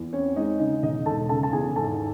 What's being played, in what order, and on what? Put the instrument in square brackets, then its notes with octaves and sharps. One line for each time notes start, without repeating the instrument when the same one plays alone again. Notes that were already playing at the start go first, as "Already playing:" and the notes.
Already playing: [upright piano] E2
C4 C#4 C#5
G#3 D#4 D#5
C#3 D#4 D#5
E1 D#4 D#5
E1 A4 A5
C#3 A4 A5
A5
E2 G#4 G#5
G#1 A4 A5